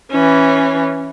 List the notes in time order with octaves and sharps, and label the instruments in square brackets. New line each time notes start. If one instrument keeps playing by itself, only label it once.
[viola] E3 C#4